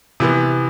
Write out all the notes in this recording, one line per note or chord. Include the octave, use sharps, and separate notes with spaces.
C3 E3 B3